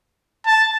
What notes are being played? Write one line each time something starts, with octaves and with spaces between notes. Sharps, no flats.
A5